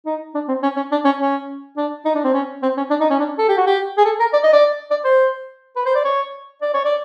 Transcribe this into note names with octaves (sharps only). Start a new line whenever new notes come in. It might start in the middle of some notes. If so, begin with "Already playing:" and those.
D#4
D4
C4
C#4
C#4
D4
C#4
C#4
D4
D#4
D4
C4
C#4
C4
C#4
D4
D#4
C#4
D4
A4
G4
F#4
G4
G#4
A4
A#4
D5
D#5
D5
D5
C5
B4
C5
D5
C#5
D5
C#5
D5